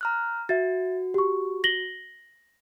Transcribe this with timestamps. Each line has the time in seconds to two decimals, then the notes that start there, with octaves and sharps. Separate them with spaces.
0.01 A#5 F6 F#6
0.49 F#4 E5 A6
1.14 G4 C#6
1.64 A#6 F#7 G7